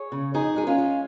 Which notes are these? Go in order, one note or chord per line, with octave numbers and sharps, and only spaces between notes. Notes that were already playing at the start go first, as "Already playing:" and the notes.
Already playing: G#4 C#5
C#3
F2 D#4 G#4
G#3 G#4
C#4 F4
G#3